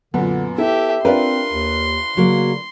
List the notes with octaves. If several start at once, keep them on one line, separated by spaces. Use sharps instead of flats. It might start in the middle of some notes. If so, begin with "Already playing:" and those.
F#2 A#2 D3 B3
E4 G4 A4 E5
C4 D4 F4 A#4 B4 C6
D#2
C#3 F#3 A#3